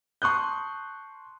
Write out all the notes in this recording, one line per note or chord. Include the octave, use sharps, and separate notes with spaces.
A5 C6 C#6 D#6 F#6 G6